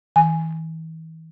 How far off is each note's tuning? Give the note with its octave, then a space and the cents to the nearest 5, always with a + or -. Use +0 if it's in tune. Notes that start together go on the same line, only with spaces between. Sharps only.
E3 -40 G#5 +0